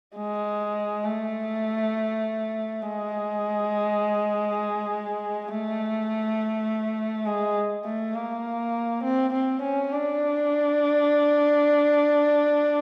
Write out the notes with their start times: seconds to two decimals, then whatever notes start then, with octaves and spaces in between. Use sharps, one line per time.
0.17 G#3
1.05 A3
2.82 G#3
5.48 A3
7.25 G#3
7.85 A3
8.14 A#3
9.04 C4
9.33 C4
9.62 C#4
9.92 D4